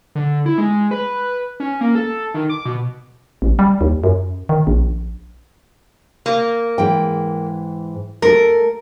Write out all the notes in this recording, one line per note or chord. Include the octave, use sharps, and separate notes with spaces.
D3
E4
G#3
B4
C#4
A#3
A4
D#3
D6
B2
A1
G3
D#2
F#2
D#3
A#1
A#3
G#2 E3 G5
A3 A4 A#4